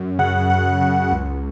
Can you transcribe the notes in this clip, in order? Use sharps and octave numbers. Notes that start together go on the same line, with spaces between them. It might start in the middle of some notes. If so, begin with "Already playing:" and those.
Already playing: F#2
C#3 F#5
F#2 F#5
C#3
C#2